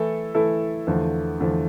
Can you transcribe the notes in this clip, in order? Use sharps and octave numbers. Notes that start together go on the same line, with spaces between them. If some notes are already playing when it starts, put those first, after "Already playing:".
Already playing: E3 A3 E4 A4
E3 A3 E4 A4
E2 D3 F3 A3
E2 D3 F3 A3